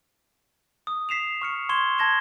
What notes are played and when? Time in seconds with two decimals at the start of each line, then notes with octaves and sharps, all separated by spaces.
0.87 D#6
1.09 B6 C7 E7 F7
1.42 C#6 F6 C#7
1.69 C6 C#6 G#6 E7 G7
1.98 A5 G#6 A#6 E7 G7